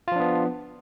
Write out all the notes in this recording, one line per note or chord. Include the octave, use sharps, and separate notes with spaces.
F3 B3 D4 F4